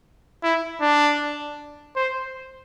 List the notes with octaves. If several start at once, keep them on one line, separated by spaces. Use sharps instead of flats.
E4
D4
C5